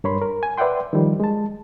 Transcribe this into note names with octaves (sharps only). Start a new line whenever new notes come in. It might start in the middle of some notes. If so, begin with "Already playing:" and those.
G2 A#4 C#5 B5 C6
A#4
G#5
B4 D5 E5 F#5 G5 C6
D#3 F3 G3
G#3 A5